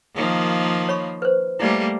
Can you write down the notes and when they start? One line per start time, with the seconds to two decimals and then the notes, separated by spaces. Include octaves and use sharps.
0.15 D#3 F3 A#3
0.89 C#5 B5 C#6
1.22 B4 C5
1.60 G3 A3 A#3 E4 D5